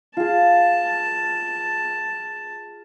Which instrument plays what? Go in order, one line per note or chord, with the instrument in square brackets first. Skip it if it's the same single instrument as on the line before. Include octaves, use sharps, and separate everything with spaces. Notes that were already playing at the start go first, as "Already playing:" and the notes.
[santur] F4 G#4 [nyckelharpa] A5